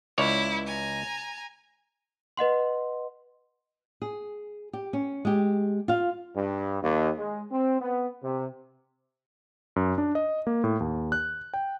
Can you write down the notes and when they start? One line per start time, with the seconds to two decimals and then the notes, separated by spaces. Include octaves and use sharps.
0.18 C#2 E4 C#5 D5
0.67 G#5 A#5
2.37 B4 D#5 F#5 C6
4.02 G#4
4.73 G4
4.93 C#4
5.25 G#3 G4
5.88 F4 F5
6.36 G2
6.83 D#2
7.19 G#3
7.52 C4
7.81 B3
8.23 C3
9.76 F#2
9.98 D4
10.15 D#5
10.47 A#3
10.64 A2
10.80 D#2
11.12 F#6
11.54 G5